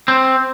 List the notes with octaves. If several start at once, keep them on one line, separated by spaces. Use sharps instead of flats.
C4